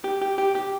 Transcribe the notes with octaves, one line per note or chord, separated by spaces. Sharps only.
G4
G4
G4
G4